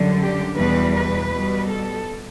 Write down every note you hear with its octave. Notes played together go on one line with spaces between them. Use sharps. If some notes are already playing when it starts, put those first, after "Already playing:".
Already playing: F#2 D3 G3
G4
E2 B2 G3 B4
B4
B2 G3
A4